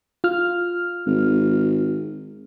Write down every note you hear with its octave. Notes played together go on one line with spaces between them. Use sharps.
F4 F6
G#1